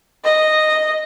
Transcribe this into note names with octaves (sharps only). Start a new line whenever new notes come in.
D#5